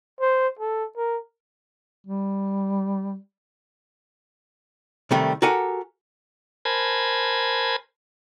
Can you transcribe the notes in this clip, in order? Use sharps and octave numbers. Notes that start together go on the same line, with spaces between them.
C5
A4
A#4
G3
C3 D#3 G3 A3
F#4 G4 A4 A#4 F#5 G#5
A#4 C5 G#5 A5 B5 G#6